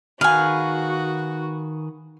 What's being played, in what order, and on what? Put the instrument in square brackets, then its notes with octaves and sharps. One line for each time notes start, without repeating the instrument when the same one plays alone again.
[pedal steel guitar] D#3 G#4 B4 [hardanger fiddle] F#4 [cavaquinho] F5 G#5